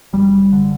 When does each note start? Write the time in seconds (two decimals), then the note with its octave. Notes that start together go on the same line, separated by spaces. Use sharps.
0.13 F#1 G3
0.52 D3